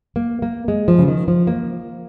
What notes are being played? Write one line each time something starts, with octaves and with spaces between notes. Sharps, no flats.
A#3
A#3
G#3
F3
C#3
D#3
F3
A#3